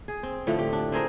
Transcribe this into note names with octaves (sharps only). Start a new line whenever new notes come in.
G#4
C4
A2 D3 F3 A3
G4
D4
C4 G#4 A#4 C5